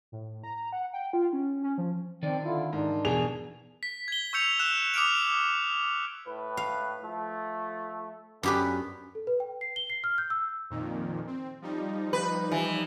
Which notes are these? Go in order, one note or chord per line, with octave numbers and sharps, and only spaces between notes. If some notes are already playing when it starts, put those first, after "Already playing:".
A2
A#5
F#5
G5
F4
C#4
C#4
F3
D#3 C4 D5
D3 E4 F4
G#2 D4 A#4
E2 B2 E3 G#4 F7
B6
G#6 G7
C#6 E6 G6 C#7 F7
E6 F#6 E7
D6 D#6 F6 D7 F7
A2 B4
F5
F3 A3
F#2 D3 B3 C#4 G4 B4
A4
B4
G5
C7
G7
C7
F6
G6
E6
F2 A#2 D#3
C4
F3 G3 D#4
B4
E3